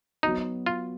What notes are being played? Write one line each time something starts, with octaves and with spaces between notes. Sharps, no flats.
F#3 B3 D#4 F#4
F4